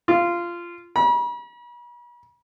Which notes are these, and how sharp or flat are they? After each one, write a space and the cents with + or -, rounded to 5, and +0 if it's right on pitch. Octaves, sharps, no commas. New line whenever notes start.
F4 -15
B5 -45